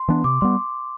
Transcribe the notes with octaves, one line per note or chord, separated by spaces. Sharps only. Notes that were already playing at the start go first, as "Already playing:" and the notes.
Already playing: C6
E3 B3 D4
C3 D6
G3 B3 C6